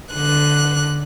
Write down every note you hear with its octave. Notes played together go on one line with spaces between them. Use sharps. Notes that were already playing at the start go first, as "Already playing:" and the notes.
D3 F#6